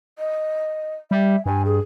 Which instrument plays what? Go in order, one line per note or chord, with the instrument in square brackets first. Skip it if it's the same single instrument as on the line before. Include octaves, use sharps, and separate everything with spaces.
[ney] D#5
[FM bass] G3 [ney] E5
[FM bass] G2 [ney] G#5
[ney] G#4